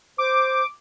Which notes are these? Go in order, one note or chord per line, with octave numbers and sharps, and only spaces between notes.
C5 D6